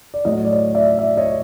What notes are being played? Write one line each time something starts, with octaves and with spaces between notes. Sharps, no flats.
D5
A2 F#3 C#5 D#5
D5
C#5 D#5
D5 E5
D5 E5
C#5 D#5